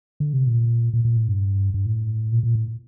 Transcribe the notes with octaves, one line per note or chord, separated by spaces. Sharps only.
D3
C3
A#2
A#2
A#2
A2
G2
G2
A2
A#2
A#2
A2